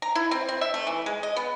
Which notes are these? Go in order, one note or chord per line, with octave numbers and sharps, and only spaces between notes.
A#5
E4
C4
C4
E5
A3
E3
G#3
D#5
B3